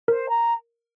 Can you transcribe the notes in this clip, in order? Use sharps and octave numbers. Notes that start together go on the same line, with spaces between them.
A#4 C5
A#5